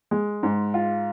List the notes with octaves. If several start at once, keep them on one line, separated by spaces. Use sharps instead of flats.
G#3
G#2
F4